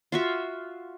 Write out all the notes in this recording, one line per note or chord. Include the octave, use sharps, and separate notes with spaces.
F4 F#4 E5